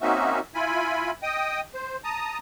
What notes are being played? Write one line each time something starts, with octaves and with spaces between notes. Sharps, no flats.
A#3 C4 C#4 D#4 F#4 E5
E4 F4 G#5 B5
D#5 G5 D#6
C5
A5 A#5 D#6